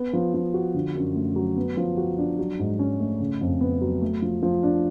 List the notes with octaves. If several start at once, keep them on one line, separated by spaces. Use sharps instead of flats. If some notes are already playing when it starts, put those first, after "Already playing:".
Already playing: B3
F3
F3
F#4
D3
F#2
A3
F#3
B3
F3
F#4
D4
F#3
G#2
C#4
A3
C#3
F2
B3
F#3
A3
F3
F3
D4